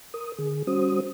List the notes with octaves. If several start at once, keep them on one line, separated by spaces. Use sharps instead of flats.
A#4 D#6
D3 G#4
G3 C#4 F#4 C5 D#6